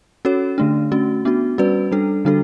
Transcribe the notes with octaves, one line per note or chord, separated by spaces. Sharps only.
C#4 F#4 A4 C#5
D3 A3 D4
A3 C#4 F#4
B3 D4 F#4
G3 C#4 F#4 B4 D5
G3 D4 A4
D3 G3 D4 F#4 A4